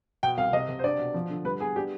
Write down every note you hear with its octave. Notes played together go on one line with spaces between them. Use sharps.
B2 G5
C2 F5
C3 D#5
C3
C5
D4 D5
B2
F3
D3
G3 B4
B3 G#4
D4 G4